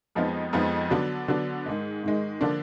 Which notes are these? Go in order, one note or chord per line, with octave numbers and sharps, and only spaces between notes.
F2 F3 G#3 B3 D#4
F2 F3 G#3 B3 D#4
D3 F#3 B3 D4
D3 F#3 B3 D4
G#2 D#3 G#3
G#2 D#3 G#3
D3 F3 A#3 D4